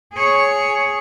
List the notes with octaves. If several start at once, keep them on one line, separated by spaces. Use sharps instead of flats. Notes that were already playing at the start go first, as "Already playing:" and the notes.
G#4 C#5